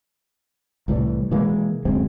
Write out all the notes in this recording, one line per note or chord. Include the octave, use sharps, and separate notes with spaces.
C2 A2 E3 G3
B2 E3 G#3 A#3
D1 F#2 G#3 C4